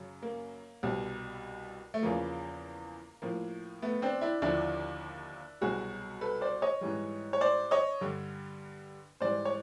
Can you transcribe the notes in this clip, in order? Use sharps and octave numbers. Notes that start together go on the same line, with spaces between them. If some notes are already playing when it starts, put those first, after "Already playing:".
Already playing: F#2 C#3 F#3
A#3
C2 B2 G3
A3
E2 C#3 F3 A#3
A2 F3 A#3
A3 B3
C4 D4
D4 E4
D#2 D3 F3 D4 E4
C2 B2 F#3 F#4 G#4
A4 B4
C5 D5
C#5 D#5
G#2 E3 G3
C#5
C5 D5
C#5 D#5
G2 D3 G3
G#2 E3 G3 C5 D5
C#5